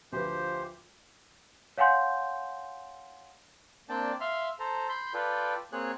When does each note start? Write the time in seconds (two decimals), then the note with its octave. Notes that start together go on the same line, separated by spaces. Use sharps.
0.12 D2 F3 G4 B4 C5
1.78 C#5 F5 F#5 G#5 C6 G6
3.89 A#3 C4 D4 D5 G5 A5
4.21 E5 F5 C6 F6
4.59 A4 C5 A#5
4.89 B5 C6 G6
5.14 F4 A4 B4 D5 G5
5.72 A#3 C4 G#4 C#5 F#6